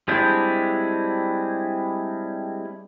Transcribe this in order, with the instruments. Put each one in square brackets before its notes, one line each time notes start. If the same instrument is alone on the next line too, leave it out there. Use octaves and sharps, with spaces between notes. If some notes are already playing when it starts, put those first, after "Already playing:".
[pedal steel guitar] G3 G#3 C4 D4 E4